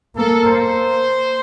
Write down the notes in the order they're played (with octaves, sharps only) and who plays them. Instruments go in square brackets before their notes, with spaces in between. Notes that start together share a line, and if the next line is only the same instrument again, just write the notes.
[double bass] A#3 [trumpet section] A4
[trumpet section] C5